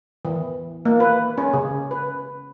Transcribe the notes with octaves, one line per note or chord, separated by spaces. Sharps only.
E3
A#3
B4
C#4
C#3
B4